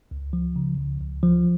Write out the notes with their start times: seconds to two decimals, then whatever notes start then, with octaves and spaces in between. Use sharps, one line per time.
0.11 C#2
0.33 F3
0.56 C#3
0.78 C#2
1.00 C#2
1.23 F3